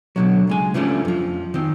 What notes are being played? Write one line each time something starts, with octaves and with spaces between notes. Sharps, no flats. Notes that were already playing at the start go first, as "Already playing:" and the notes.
B2 D3 F#3
C#2 G#3 G#5
C#3 F3 G3 A3 C#4 D4
F2 F3
D#3 C4